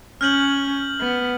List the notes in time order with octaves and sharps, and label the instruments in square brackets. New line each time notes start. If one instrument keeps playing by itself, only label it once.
[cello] C#4 [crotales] F6 G6 F#7
[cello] B3